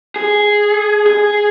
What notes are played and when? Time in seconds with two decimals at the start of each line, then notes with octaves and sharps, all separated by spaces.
0.16 G#4
1.06 G#4